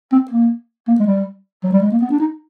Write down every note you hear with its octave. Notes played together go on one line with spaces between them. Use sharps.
C4
A#3
A#3
G#3
G3
F#3
G3
G#3
A#3
B3
D4
D#4